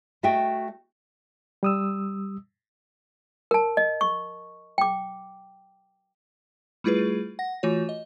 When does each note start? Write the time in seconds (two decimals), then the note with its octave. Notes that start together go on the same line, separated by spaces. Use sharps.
0.23 A3 F#4 D#5 E5 G5
1.63 G3 D#6 E6
3.51 A#4 A5
3.77 D#5
4.01 C#6
4.78 G5 D6
6.84 G3 A3 E4 F4 G#4 B4
7.39 F#5 A#6
7.63 E3 A3 F4 F#4 C#5
7.89 D#5